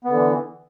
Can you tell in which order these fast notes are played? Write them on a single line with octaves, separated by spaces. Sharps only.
B3 D3 E3